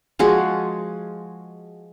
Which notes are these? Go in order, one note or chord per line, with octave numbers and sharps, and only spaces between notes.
F3 G#3 F#4 G#4